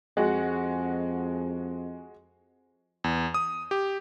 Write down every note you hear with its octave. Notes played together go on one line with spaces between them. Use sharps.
F2 G#3 F#4 F#5
E2
D#6
G4